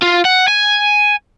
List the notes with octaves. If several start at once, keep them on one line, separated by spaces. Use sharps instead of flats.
F4
F#5
G#5